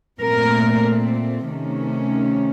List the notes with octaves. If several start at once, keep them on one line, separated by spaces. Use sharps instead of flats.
A#2 A3 C4 A#4
C3 D#3 A3 C#4